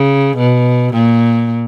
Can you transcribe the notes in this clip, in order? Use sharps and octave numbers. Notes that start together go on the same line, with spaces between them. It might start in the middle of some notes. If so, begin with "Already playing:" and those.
Already playing: C#3
B2
A#2